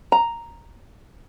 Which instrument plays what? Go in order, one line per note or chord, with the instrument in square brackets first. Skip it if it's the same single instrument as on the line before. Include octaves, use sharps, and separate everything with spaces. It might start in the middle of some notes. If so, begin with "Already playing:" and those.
[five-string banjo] A#5